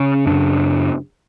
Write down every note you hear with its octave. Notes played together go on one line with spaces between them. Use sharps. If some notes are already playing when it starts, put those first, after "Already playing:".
Already playing: C#3 C#4
F#2 C#3 D4